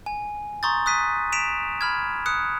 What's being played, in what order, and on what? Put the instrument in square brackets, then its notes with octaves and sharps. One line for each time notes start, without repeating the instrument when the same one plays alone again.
[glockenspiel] G#5
A#5 C6 C#6 D#6 G6 A6
D#6 F#6 B6 D#7
B6 D7 E7 F7
B5 F6 G#6
D#6 F#6 C#7